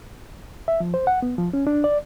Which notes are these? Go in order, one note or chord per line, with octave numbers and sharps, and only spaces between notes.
E5
F3
C5
F#5
B3
F3
C#4
D4
D5